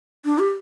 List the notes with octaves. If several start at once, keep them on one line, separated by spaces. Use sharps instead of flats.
D4
G4